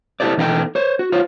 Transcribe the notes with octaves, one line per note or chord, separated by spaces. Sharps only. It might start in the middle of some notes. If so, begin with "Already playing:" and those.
E4 G4 A4 C5 D5
B2 E3 D#4 E4 A4 G5
C5 C#5
F#4
F4 C5 C#5